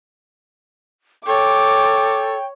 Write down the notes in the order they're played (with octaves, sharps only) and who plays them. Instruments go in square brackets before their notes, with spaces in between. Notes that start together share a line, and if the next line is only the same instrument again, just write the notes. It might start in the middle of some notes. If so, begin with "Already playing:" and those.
[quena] A4 [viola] C#5 [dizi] G5 [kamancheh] D6